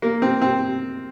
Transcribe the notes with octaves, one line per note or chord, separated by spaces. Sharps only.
A#3
C4
C4